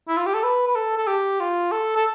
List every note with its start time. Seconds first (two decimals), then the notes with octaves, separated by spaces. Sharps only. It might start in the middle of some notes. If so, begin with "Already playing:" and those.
0.08 E4
0.17 F4
0.26 G4
0.35 A4
0.43 B4
0.67 B4
0.75 A4
0.98 A4
1.07 G4
1.40 F4
1.72 A4
1.96 A4